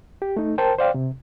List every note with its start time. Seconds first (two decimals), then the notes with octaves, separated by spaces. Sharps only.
0.22 G4
0.37 A3 D#4
0.58 A#4 C5 G5 A5
0.79 C5 D5 F5 G5
0.94 C3